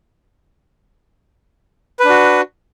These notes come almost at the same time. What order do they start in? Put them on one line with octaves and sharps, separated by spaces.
B4 D4 F#4